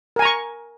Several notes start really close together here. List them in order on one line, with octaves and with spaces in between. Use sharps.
A#4 G#5 A#5 C#6